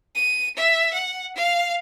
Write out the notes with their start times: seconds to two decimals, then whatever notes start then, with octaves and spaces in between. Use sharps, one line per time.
0.15 D#7
0.56 E5
0.93 F#5
1.35 F5